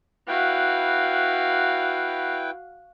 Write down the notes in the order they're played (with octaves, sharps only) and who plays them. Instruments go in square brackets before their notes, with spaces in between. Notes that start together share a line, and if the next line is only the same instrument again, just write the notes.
[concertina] E4 B4 G5 [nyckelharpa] F#4 F5